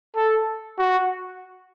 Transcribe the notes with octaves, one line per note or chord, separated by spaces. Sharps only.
A4
F#4